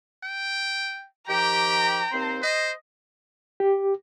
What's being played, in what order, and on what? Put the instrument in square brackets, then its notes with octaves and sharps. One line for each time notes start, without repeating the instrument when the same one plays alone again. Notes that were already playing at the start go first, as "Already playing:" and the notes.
[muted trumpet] G5
[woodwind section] D#3 F3 G4 [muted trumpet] G5 [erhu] A#5
[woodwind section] D#2 C4 C5
[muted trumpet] C5 [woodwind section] D#5
[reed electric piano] G4